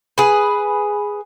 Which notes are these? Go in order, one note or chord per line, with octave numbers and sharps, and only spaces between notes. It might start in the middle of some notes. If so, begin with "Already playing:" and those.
G#4 B4